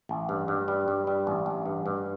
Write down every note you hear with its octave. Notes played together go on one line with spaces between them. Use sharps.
A1
G2
G2
G3
G2
G3
A1
A1
G2
G2